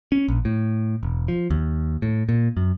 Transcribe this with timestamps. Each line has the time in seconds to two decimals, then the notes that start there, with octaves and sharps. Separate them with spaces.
0.12 C#4
0.28 A#1
0.45 A2
1.03 E1
1.28 F3
1.50 D#2
2.02 A2
2.29 A#2
2.57 F#2